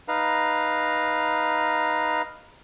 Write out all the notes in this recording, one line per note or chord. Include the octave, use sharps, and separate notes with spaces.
D#4 B4 F5 A#5